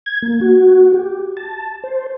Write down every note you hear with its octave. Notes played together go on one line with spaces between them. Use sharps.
G#6
A#3
F#4
G4
A5
C5